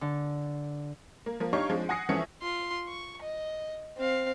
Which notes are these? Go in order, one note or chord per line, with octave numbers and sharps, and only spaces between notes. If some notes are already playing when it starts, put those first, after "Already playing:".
D3
A#3
F3 A#3
D4 D#4 G4 C#5 F5 C#6
F3 G#3 C4 D4
F#5 G#5 D#6 A#6 C7 C#7
E3 F3 C#4 A4 E5 C#7
F4 C6
C#6
D#5
C4 F5